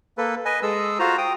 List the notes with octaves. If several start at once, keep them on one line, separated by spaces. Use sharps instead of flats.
A#3 A4 B4
B4 D#5 G#5
G#3 G#4 A4 E6
F4 F#4 C5 A#5
G5 D#6